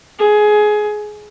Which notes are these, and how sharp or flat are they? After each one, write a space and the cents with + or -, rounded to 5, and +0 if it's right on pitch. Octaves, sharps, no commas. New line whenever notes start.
G#4 +20